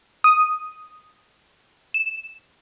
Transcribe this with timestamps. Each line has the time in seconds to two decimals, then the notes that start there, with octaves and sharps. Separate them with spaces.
0.24 D#6
1.94 E7